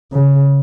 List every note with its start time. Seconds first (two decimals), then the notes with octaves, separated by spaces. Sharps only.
0.13 C#3